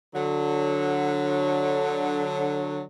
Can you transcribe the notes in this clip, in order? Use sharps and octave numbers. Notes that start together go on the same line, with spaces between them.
D3 F#3